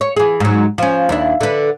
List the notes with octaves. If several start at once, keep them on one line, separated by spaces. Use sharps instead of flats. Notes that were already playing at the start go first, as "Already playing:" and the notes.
C#5
E3 G#4
G#2 F#3
F3 C#4
D#2 D4 E4
D3 B4